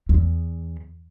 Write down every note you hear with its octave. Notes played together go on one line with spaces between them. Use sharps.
E2